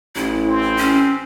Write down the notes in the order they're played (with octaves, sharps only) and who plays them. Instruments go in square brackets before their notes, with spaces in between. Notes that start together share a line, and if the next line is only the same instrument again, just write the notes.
[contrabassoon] A1 [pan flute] E4
[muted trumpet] C4
[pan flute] C#4